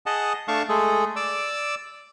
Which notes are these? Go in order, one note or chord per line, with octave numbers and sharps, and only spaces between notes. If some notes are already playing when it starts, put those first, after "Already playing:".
G#4 D#5 F#5 A5
A3 D4 F5 A5 C#6
G#3 A3 G#4 A4
D5 D6 E6